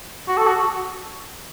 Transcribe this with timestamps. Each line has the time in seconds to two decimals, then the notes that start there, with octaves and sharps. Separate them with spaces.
0.28 F#4
0.37 A4
0.47 F#4